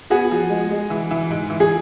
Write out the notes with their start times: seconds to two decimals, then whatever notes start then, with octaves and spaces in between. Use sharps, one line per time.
0.10 B3 F#4 G#4
0.31 F3
0.50 G#3
0.70 G#3
0.90 E3
1.11 E3
1.30 G#2
1.50 E3
1.60 G#4